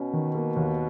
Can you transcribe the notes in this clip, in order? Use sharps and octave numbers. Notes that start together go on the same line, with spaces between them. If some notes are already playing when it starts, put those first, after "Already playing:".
Already playing: B2 C#4
D#3
A#3
D#2